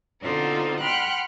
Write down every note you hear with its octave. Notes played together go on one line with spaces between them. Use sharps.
B2 D3 C4 D#4 F4 A4
F#5 G5 B5 C6 F6 F#6